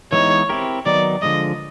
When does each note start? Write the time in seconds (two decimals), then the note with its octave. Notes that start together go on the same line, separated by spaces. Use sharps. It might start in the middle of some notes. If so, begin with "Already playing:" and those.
0.12 E3 G#3 B3 D#4 C#5
0.49 C4 E4 G4 A#4
0.86 D#3 F#3 B3 D#4 D5
1.22 D3 F3 G#3 D#5